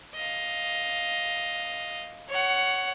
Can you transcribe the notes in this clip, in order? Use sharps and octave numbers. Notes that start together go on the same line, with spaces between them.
D#5 F5
C#5 F#5